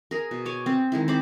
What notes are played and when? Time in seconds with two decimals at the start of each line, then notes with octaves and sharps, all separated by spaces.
0.11 G#4 A#4
0.31 B2
0.45 C#5 G#5 D6
0.66 C4
0.92 D#3 G#3 E4
1.08 C4 C5 B5 D6